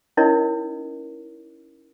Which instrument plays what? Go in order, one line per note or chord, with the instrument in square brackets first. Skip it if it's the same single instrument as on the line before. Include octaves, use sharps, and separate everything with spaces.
[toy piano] C#4 D#4 E4 A#4 C#5 D#5